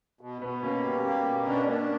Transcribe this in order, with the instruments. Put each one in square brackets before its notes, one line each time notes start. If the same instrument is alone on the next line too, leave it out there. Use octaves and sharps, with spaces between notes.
[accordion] B2
[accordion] B2 [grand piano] B3
[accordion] A#3 [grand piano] C#4
[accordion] G3
A#3
B2
[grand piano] C#4 [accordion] D4
[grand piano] A#3 [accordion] D4